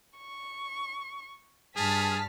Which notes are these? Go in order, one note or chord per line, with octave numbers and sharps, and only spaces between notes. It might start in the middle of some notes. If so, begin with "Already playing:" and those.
C#6
G2 G#4 A5 F6 B6